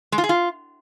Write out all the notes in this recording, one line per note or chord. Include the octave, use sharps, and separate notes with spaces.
G#3
F4
G#4
F4